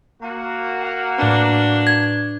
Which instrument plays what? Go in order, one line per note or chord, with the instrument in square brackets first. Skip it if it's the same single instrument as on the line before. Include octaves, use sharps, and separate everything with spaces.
[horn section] A#3 F#4
[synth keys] F#5 F6 F#6
[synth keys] A2 B4 [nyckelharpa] D4
[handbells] G#6